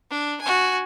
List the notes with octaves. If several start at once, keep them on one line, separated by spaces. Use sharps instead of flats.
D4
F#4 G#5